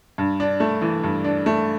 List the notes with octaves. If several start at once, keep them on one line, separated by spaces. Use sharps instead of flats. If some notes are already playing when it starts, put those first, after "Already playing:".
G2
D4
A3
E3
G2
D4
A3